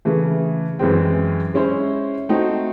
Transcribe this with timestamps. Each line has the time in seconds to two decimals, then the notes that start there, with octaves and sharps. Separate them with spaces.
0.05 C#3 E3 A3
0.79 F#2 E3 G#3 C4
1.54 G#3 C#4 E4 C5
2.29 A3 C4 D#4 F#4